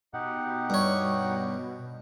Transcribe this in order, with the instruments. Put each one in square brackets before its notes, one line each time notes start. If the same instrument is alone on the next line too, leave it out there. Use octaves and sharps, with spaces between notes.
[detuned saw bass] B2 [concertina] D#4 G4 F#5
[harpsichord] G2 C#5